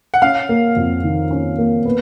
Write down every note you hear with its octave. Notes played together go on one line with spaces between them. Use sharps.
F#5
C#4 F5
A#3
F2
D#3
C#4
A#3
B3